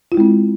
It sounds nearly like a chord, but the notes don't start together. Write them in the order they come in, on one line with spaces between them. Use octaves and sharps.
F4 E4 G#3 C4